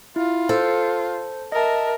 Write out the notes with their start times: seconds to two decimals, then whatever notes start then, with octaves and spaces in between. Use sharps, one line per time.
0.16 E4 F4
0.49 A4 C5
1.52 A#4 D#5 E5 A5